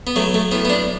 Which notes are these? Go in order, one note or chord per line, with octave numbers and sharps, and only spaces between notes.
B3
F#3 A3
A3
A2 B3
B3
D4